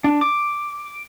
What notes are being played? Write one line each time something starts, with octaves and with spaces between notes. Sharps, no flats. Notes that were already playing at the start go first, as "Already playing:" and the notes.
D4
D6